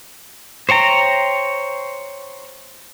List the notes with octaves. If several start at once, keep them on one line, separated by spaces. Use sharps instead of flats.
C5 C#5 G5 A#5